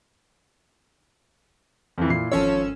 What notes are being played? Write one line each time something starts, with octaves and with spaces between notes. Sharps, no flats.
F2 E3
A#2 E4 C7
G#1 F3 C#4 A4 C#5 E6